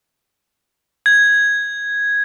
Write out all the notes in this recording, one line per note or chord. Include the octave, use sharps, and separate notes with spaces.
G#6